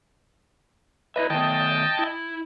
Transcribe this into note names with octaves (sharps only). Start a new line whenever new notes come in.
E4 B4 D#5 E5
D#3 A3 B3 D#5 G5 A5
E4